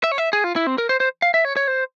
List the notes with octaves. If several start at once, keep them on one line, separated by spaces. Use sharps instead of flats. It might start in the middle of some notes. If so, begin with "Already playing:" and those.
E5
C#5
E5
G#4
F4
E4
C4
A#4
C5
C5
F5
E5
C#5
C#5
C5